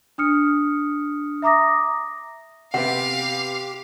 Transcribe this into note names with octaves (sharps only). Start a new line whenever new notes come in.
D4 D#6 F6 C#7
E5 A#5 D6 D#6 A#6
C3 B3 G4 F5 F#5